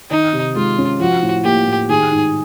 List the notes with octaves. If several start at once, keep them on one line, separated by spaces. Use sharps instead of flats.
D#3 D#4
C3
G#3 F4
C#4
F3 F#4
A2
A#3 G4
A2
D#3 G#4
G#2